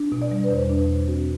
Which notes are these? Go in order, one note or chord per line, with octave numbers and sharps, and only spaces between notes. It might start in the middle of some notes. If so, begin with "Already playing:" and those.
Already playing: D4
B2
D5
G3
B4
E2 C5
D4
B2
C4 F#4